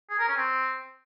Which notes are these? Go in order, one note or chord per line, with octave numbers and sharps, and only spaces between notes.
G#4
A#4
C#4
C4